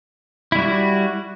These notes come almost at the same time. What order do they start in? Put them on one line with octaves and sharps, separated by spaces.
E4 G3 F#4